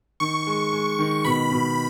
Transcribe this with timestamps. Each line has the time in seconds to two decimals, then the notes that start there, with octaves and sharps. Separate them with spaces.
0.20 D#3 C#6
0.47 G#3
0.73 G#3
0.99 D#3
1.25 B2 B5
1.51 B2